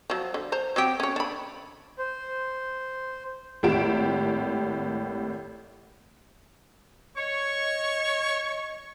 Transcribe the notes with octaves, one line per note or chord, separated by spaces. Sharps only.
F3 F#3
D3
C5 A#5
F#3 C4 G4
C#4 C#5
D4 B5
C5
G#1 A2 G4 D7 E7
C#5 D#5 C#6